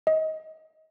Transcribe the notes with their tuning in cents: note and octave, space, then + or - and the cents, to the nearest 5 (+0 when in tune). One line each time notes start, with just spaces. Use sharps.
D#5 +25